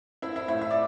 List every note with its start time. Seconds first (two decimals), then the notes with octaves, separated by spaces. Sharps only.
0.22 C4 E4 E5
0.36 E4 E5
0.48 A2 E4 E5
0.62 E5
0.71 D5